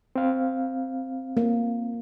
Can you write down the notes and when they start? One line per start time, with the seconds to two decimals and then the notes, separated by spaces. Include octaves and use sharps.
0.16 C4 F5
1.37 A#3